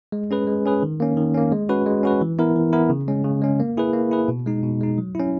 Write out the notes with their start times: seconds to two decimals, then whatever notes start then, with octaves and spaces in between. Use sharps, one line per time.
0.12 G#3
0.31 C#4 G#4 B4
0.47 G#3
0.65 C#4 G#4 B4
0.83 D#3
1.00 A#3 C#4
1.17 D#3
1.34 A#3 C#4
1.52 G#3
1.69 C#4 F#4 B4
1.86 G#3
2.03 C#4 F#4 B4
2.21 E3
2.39 B3 E4 A#4
2.56 E3
2.73 B3 E4 A#4
2.89 C#3
3.08 G#3 C#4
3.24 C#3
3.42 G#3 C#4
3.60 A#3
3.77 E4 G#4 B4
3.93 A#3
4.11 E4 G#4 B4
4.28 B2
4.46 G#3 D#4
4.63 B2
4.81 G#3 D#4
4.98 F#3
5.15 C#4 E4